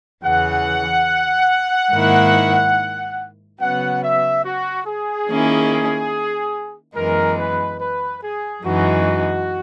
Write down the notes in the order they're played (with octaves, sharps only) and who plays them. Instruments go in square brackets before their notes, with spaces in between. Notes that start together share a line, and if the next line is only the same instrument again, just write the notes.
[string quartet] E2 C#3 E3 [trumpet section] F#5
[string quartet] G#2 D#3 A#3 E4
[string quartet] C#3 F#3 B3 [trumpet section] F#5
[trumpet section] E5
F#4
G#4
[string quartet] D#3 A#3 C#4 E4
[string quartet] F#2 E3 G#3 B3 [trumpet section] A#4
[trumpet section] B4
B4
G#4
[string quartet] F#2 E3 G#3 D#4 [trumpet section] F#4